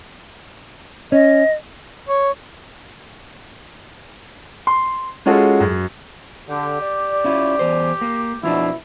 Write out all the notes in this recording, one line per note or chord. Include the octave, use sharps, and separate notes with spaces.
C#4 D#5
C#5
C6
G#3 C#4 F4 F#4 G#4 A4
F#2
D3 G4
D5
C#4 E4 F4
E2 C5
A#3
F2 B2 F3 D4 E4